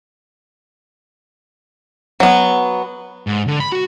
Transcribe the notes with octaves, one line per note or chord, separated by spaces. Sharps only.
F#3 B3
G#2
D3
B5
F#4